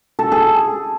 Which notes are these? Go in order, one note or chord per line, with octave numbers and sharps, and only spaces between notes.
A4
G#4